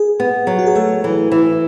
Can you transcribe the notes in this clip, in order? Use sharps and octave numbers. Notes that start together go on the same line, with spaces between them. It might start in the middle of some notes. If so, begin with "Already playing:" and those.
Already playing: G#4
B3
F#3
F#4
G#4
A3 A4
E3
E3